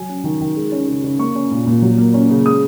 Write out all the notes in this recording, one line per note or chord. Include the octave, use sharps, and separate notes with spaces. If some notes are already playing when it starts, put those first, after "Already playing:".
Already playing: F#3 G#5
C#4
D#3
D#3
G#3
C#4
C#3
C#3
A#3 C#6
C#4
A#2
A#2
F#3
A#3
C#4
C#3
G#3 D#6